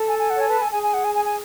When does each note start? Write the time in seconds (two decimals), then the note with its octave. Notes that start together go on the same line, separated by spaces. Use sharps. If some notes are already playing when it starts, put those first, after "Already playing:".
Already playing: A4
0.08 G#5
0.19 G#5
0.30 F#5
0.35 C#5
0.41 G#5
0.48 B4 A5
0.60 A4 G#5
0.72 G#4 G#5
0.83 G#5
0.94 F#5
1.04 G#5
1.15 G#5
1.25 G#5